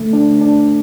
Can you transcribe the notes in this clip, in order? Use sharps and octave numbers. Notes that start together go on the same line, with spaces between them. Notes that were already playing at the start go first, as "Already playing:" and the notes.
Already playing: D3 A3
D4
D4